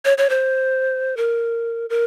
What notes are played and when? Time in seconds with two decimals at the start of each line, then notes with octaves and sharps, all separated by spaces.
0.05 C#5
0.18 C#5
0.30 C5
1.17 A#4
1.90 A#4